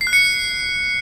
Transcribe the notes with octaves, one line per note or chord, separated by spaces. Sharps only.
C7
F#6
C#7